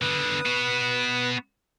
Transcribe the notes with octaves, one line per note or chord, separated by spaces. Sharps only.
D3 B3 B4 D#6
B3 F#4